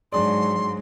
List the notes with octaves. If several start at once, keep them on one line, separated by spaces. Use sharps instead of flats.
G#2 F#3 D4 G#4 D5 C6